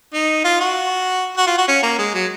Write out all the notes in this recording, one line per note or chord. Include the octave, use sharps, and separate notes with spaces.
D#4
F4
F#4
F#4
F4
F#4
C#4
A#3
G#3
F#3